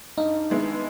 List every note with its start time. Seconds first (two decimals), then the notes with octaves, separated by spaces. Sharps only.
0.18 G2 D#4
0.50 D#3 G#3 B3 E4